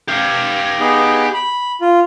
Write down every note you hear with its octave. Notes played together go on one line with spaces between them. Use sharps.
G4 F5
B3 D#4 G#4
B5
F4